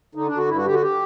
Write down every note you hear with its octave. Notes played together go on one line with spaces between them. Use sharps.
D3 D#4
D4
D3
F#4
G2 E4
F#4
D3 G4
F#4
G4